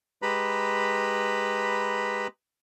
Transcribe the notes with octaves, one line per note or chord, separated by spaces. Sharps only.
G#3 G4 B4 A#5 B5